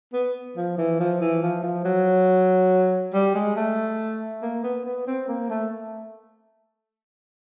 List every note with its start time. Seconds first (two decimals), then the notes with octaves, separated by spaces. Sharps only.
0.13 B3
0.57 F3
0.78 E3
1.00 F3
1.21 E3
1.43 F3
1.63 F3
1.85 F#3
3.14 G3
3.35 G#3
3.56 A3
4.42 A#3
4.64 B3
4.86 B3
5.07 C4
5.28 A#3
5.50 A3